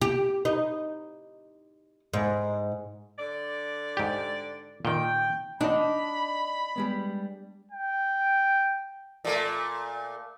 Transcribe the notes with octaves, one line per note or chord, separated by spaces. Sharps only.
G4
D#4
G#2
D3 D5
G#2 G4
A#2 D#3 G5
D4 D#4 D#5 F#5 B5
G3 G#3 B3
G5
A#2 A3